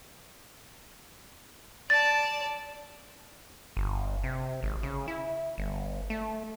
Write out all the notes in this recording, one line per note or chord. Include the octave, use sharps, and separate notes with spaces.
D5 A5 A6
G1
C3
G#1
C#3
E4
G1
A3